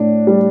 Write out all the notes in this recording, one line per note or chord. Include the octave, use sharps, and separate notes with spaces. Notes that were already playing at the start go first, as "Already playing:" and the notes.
Already playing: A2 D4
G3